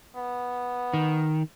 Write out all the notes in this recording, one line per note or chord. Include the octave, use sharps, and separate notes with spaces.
B3
D#3